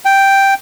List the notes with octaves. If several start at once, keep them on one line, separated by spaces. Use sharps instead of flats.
G5